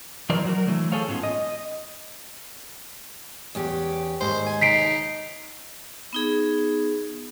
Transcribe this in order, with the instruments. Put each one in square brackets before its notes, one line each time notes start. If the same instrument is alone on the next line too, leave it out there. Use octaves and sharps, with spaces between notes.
[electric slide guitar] E3 F#3 A#4 C5 D5
F#3 F#4 A#4
D3 E3 F#3 A3
G#4 A4 C5 C#5 F5
G#2 B3 C#4 F4
D#5
[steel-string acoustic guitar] E2 C#4 G4
[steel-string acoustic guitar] D#2 G#2 [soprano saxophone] C5
[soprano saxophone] G#5
[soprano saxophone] D#4 [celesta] B6 C7 D7
[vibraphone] B3 D#4 G#4